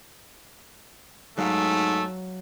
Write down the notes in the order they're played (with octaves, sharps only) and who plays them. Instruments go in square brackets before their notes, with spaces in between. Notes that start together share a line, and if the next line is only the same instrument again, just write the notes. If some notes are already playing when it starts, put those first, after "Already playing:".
[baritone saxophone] G#2 [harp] F#3 F5 [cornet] A3